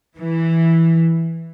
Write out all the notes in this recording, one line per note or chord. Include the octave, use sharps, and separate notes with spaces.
E3